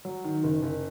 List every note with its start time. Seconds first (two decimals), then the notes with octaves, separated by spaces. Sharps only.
0.05 F#3
0.24 D#3
0.43 F#1
0.63 F#1